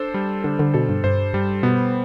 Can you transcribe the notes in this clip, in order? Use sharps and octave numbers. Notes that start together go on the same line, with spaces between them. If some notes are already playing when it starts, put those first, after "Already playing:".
Already playing: D4 A4 C5
G3
D3 D4
D3
B2 A4
G2
G2 C5
G2 G3
B2 B3